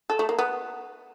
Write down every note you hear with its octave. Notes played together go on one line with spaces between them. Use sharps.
A4
A3
A#3
B3